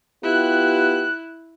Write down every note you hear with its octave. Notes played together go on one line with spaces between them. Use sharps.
B3 E4 F4 G4 F#6